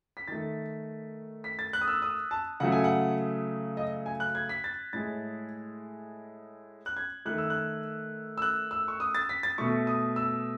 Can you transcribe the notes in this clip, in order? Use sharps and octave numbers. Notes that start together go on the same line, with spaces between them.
B6
D#3 A3 A6
B6
A6
F#6
D#6
E6
D#6
A5
C#3 F#3 A3 F#5
G#5
F#5
D#5
G#5
F#6
G#6
B6
A6
A2 G#3 A6
F#6
G#6
D#3 A3 F#6
E6
F#6
E6
F#6
E6
C#6
D#6
A6
B6
A6
B2 A3 C#6
D#6
E6